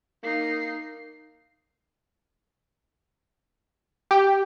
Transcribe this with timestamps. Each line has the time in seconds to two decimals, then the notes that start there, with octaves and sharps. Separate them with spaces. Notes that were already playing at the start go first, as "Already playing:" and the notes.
0.23 A#3 D#4 C7
4.11 G4